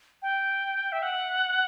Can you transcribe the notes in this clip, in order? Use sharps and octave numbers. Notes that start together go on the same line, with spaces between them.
G5
E5
F#5